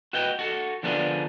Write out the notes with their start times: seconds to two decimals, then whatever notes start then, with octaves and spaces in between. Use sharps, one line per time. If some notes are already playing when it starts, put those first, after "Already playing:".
0.13 F#4 B4 D#5 G5
0.39 F#4 A4
0.83 D3 F3 B3 D4 G#4 A#4